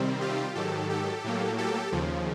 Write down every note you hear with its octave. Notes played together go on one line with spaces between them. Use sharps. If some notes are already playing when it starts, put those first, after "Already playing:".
Already playing: C3 D#3 G3 C4
F4 G4
G#2 D#3 F#3 G4 A4
G4 A4
A2 F#3 A#3
G4 A4
D#2 C#3 F3